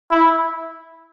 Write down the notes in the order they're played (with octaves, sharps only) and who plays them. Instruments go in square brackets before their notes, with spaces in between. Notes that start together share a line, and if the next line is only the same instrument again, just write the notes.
[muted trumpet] E4